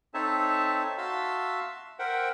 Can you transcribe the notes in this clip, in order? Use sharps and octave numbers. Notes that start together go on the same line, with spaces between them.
C4 D#4 A4 C#5 E5 A5
F#4 E5 F5 A5 C6 E6
A#4 C5 E5 F#5 G5